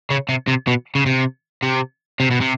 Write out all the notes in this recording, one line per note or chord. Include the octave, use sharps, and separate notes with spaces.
C#3
C3
C3
B2
C#3
C3
C3
C3
B2
C3